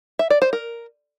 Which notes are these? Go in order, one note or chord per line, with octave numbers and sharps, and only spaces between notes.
E5
D5
C5
A#4